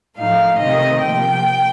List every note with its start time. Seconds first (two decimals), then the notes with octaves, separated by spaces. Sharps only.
0.17 A2 F3 A3 D#4 F5
0.59 C3 D#3 A3 C4 D#5
1.01 C3 F3 A#3 G5